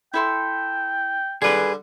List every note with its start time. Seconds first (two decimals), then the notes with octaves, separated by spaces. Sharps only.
0.14 E4 A4 G5 C6
1.42 D3 G3 G#4 B4